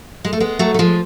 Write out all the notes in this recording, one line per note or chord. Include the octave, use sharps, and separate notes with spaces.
G#3
A3
G#3 B3
F#3 A3
A3
F3 G#3